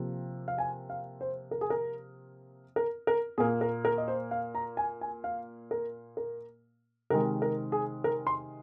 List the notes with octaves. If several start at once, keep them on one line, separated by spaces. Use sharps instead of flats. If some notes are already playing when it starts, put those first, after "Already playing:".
Already playing: C3 F3 A#3
F5
G#5
F5
C5
A#4
G#4
A#4
A#4
A#4
A#2 A#3 G#4
A#4
A#4
D#5
C5
F5
A#5
G#5
G#5
F5
A#4
A#4
C3 D#3 G#3 A#4
A#4
G#4
A#4
C6